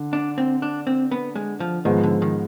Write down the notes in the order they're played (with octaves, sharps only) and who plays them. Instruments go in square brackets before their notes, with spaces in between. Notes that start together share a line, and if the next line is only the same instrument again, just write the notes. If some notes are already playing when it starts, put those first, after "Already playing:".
Already playing: [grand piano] D3
[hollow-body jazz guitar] D4
C4
D4
C4
B3
G#3
F3
[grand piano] G#2 F3 G#3 B3 [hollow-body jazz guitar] D#3
[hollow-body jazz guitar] D3
D#3